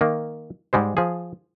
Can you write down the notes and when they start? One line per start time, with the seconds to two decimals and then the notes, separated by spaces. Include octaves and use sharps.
0.01 D#3 A#3
0.73 G#2 G3 G#3 C5
0.97 F3 G#4